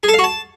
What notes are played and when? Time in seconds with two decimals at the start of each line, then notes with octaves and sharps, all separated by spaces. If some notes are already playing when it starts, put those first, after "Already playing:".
0.03 G#4
0.08 A4
0.14 F5
0.19 F#4
0.24 A5